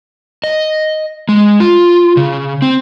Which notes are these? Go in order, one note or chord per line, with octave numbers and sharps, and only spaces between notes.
D#5
G#3
F4
C#3
C4